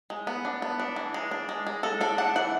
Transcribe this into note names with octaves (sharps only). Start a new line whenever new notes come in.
G#3
B3
D4
B3
D4
E3
G#3
D4
G#3
G#3
G#3 A4
D4 A4
D4 F#5
E3 F#5